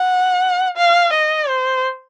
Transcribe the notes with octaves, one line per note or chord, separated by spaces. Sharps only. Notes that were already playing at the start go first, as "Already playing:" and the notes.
Already playing: F#5
F5
D#5
C5